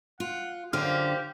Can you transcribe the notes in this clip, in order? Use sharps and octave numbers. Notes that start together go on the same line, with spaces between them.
F4 F#5
F#2 D3 A#3 C4 F4 G4 F6